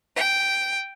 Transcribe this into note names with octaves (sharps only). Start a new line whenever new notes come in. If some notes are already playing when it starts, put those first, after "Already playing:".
G5